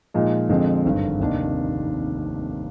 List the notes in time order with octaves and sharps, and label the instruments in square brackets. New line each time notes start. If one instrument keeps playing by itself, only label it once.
[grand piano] A#2 F3 G#3 D#4
F2 D3 F3 G#3 C4
G#1 G2 D3
F1 D#2 D#3 A#3 D4